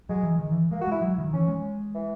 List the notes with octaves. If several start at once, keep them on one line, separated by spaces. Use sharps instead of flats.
F#3 G#3
E3
D#3
E3
G#3 A#3
F#4
G#3 E4
F#3
D#3
E3 C#4
G#3
E3